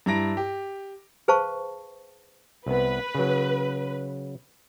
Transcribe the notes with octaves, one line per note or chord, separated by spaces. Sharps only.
G2 E4 A#5 A#6 D7
G4
G#4 B4 C5 F5 A5 C#6
C2 B3 B4
C#3 F#3